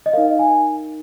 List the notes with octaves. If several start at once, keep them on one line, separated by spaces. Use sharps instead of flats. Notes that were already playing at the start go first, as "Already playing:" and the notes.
D#5
D#4 A#4 F5
G#5